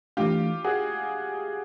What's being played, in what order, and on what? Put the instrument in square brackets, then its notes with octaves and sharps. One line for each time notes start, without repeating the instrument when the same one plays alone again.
[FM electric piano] E3 A3 D4 [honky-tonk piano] F4 G4
[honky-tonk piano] F#4 G#4